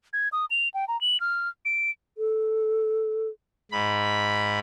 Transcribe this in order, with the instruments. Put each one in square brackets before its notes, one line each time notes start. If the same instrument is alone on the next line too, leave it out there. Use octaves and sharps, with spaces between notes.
[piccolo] G#6
D#6
F7
G5
A#5
F#7
F6
D7
[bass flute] A4
[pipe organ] G#2 B5